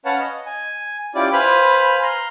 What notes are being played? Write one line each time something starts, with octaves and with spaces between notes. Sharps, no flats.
C#4 B4 C#5 F5 F#5 A5
D#5
G#5
C#4 E4 F4 G4 D5
B4 C5 F5 G#5 B5
A#5 C6 F6